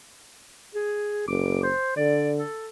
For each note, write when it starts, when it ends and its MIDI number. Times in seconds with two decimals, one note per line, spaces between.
0.75 1.25 68
1.28 1.70 30
1.28 1.61 86
1.63 1.94 72
1.96 2.41 50
1.96 2.31 74
2.38 2.68 69